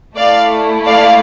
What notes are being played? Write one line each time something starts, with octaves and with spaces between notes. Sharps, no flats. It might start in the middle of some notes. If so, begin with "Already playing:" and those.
A3 E4 A4 D5 F5
D5 F5